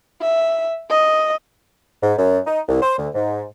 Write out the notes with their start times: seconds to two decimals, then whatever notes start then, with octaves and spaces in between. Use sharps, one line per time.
0.22 E5
0.90 D#5
2.03 G#2
2.18 F#2
2.47 D#4
2.69 C2
2.82 C5
2.99 D2
3.15 G#2